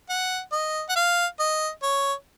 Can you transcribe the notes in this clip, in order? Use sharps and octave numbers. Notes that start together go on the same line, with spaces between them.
F#5
D#5
F#5
F5
D#5
C#5